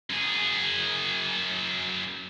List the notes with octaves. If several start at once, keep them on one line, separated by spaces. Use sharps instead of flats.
F#2 G#4